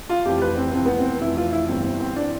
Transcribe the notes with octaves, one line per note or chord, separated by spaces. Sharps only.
F4
F1 F2 E3 G4
B4
C4
F1 F2 E3 C4
B3
C4
F1 F2 E3 E4
F4
E4
G1 G2 E3 C4
C4
C4
E3 D4